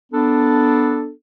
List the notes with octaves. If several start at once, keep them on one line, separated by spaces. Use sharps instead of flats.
B3 D4 A4